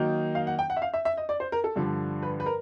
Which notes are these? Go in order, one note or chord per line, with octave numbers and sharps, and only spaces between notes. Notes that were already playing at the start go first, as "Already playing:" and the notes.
Already playing: D#3 F#3 A#3 D#4
F5
F#5
G5
F#5
E5
F5
E5
E5
D#5
D5
C5
A#4
A4
G2 D3 F3
B4
B4
A#4